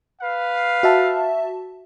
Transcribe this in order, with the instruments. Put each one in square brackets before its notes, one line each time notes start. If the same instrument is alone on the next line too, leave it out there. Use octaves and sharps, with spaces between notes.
[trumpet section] B4 F5
[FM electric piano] F#4 E5 A5